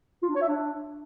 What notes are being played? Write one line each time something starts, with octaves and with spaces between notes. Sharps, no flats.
F4
D4
C#5
E5
D4